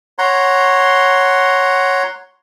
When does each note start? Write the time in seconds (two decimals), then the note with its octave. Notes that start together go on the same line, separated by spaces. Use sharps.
0.19 C#5 F#5 A#5 C6